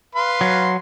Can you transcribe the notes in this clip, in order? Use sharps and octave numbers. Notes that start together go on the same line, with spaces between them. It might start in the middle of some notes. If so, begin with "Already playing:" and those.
B4 F5 C6
F#3